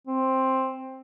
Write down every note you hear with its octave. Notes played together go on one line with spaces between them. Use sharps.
C4